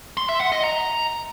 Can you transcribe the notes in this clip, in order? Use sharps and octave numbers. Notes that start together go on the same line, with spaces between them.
C6
E5
F#5
D#5
A#5